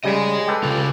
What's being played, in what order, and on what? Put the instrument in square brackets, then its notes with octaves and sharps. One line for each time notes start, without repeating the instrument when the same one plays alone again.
[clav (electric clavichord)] C#3 G3 [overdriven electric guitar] D#5 G#5
[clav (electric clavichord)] G4 A4 B4
[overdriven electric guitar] C#3 F4